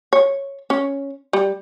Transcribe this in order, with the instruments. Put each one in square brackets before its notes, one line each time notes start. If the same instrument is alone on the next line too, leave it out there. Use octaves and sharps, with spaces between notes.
[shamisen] C#5
C#4
G3